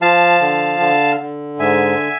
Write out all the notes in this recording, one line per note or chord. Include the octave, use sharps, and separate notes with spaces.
F3 F5 A5
D3
D3
D3
G#2 E5 G#5